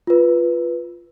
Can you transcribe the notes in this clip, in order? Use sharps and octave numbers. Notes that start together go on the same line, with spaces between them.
F4 B4